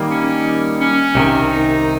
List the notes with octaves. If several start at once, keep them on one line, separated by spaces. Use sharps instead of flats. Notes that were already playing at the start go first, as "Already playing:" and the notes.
Already playing: D#3 G3 A#3
C#4
C#4
C2 C3 D#3
D#4